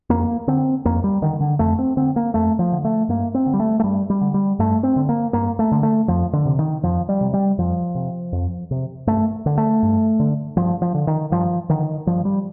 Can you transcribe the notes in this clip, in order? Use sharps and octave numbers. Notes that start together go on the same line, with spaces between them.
F2 A#3
D3 C4
F2 A#3
G3
D3 D#3
D3
F2 A3
C4
D3 C4
A#3
F2 A3
F3
D3
A3
G2 A#3
C4
D3
G3
A3
A3
G2 G3
G3
D3
G3
G2 A3
C4
D3
A#3
G2 A#3
A3
D3
A3
F2 F3
D3
C3
D#3
F2 F3
G3
C3
G3
F2 F3
C3
F2
C3
G2 A3
D3
A3
G2
D3
G2 F3
F3
D3
D#3
G2 F3
D3 D#3
G2 F3
G3